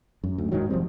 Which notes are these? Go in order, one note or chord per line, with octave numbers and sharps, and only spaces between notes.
F#2
D2
D1 G#2 D#3 F#3
E1 F3 G3 C4